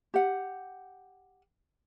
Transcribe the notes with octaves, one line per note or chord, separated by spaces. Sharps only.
G4 F#5